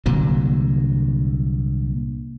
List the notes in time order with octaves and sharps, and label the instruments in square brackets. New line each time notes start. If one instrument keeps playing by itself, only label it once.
[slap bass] C2 A#2 D3 F#3